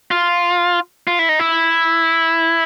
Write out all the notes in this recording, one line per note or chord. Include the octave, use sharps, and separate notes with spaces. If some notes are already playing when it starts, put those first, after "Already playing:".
F4
F4
E4
D#4
E4